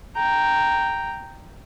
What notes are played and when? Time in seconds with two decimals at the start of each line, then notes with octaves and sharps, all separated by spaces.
0.16 G5 A#5